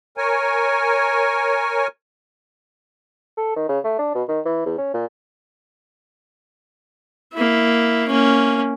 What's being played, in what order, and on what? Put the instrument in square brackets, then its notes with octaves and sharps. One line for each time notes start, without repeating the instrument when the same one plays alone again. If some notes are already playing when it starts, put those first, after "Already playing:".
[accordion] A#4 C#5 G#5
[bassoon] A4
D#3
C#3
A3
D4
B2
D#3
E3
E2
C#4
A#2
[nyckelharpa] A#3 E4
A#3 C#4